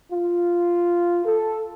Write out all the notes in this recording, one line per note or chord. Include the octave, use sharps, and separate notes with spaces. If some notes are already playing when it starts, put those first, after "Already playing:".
F4
A4